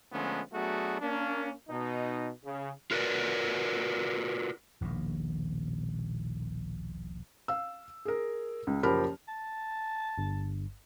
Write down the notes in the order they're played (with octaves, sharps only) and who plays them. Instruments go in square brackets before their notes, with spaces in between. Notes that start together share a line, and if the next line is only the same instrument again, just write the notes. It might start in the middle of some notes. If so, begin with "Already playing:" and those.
[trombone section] D3 F3 G#3 A3 B3 C#4
F#3 A3 B3 D4 F#4 G#4
A#3 C#4 D4
B2 D#4
C#3
[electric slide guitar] F4 F#4 A#4 B4 C#5 D5
[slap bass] D#1 A#1 B2 D#3
[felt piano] F5 E6
G#4 A#4
C#2
F#1 F3 G4 A#4 B5 F6
[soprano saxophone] A5
[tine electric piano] G1 G2